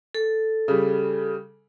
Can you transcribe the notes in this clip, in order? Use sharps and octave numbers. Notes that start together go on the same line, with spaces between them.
A4
C#3 G3